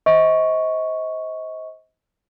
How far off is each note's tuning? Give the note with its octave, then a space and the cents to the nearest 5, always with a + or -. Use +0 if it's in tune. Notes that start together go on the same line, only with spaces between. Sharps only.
C5 +0 D#5 +35 C#6 +0